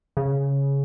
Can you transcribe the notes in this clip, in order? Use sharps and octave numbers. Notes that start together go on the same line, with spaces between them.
C#3